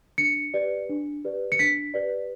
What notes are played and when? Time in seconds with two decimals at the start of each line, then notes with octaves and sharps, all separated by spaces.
0.18 D4 C#7
0.54 G4 B4 D5
0.89 D4
1.25 G4 B4 D5
1.52 C#7
1.59 D4 B6
1.94 G4 B4 D5